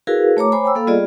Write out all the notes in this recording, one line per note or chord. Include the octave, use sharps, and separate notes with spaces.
E4 F#4 G#4 A#4 B4 F5
A3 C#5 A#5 D6
C5 C#5 G#5 B5 D6
G5 A#5 B5 E6
A#3 A4 F5
G3 B3 F4 G#4 D5 D#5